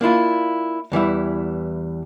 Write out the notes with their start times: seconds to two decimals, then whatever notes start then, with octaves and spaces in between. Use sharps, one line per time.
0.01 A#3 D4 E4 F4
0.92 E2 E3 G3 E4